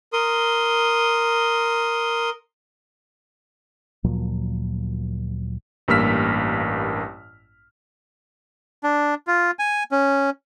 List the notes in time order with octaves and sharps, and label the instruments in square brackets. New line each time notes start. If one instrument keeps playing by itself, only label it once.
[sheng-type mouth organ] A#4 C6 D#6
[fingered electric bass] D2 A#2 F3 F#3
[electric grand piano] A1 G2 A#3 E6 F6 B6
[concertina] D4
F4
G#5
C#4